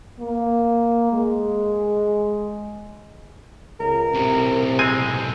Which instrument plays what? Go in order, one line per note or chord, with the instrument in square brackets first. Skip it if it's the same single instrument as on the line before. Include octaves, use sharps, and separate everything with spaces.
[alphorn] A#3
G#3
[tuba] C#2 [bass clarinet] A#4
[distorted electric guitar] B1 A2 [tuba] C3
[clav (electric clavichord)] G#3 C4 G#5